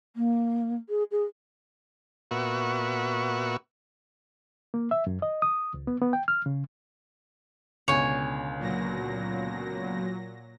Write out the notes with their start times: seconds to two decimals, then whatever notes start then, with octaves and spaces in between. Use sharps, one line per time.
0.16 A#3
0.89 G#4
1.11 G#4
2.31 A#2 B3 F#4 E5 C#6
4.74 A#3
4.91 E5
5.07 F#2
5.22 D#5
5.42 D#6
5.74 C#2
5.87 B3
6.01 B3
6.13 G5
6.28 F6
6.46 C#3
7.88 C#2 B2 D3 C#5 G#5
8.59 A#2 F#3 A#6